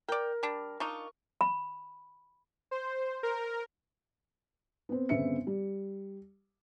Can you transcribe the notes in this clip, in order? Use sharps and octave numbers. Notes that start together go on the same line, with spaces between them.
A#4 D5 G5
G3 D4
D4 D#4 F4 C#6
B5
C5
A#4
B3 C4
G1 C#3 B3 C4 E5 C#7
G3